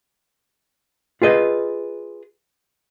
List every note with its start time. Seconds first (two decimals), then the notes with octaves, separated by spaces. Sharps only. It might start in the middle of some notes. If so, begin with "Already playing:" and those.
1.22 F4 G#4 B4 D#5